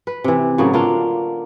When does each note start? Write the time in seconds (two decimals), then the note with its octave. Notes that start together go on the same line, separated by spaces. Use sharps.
0.07 B4
0.24 C3 E3
0.58 A2 C#3 F#3 A#3
0.73 D3 A#3 D4 F4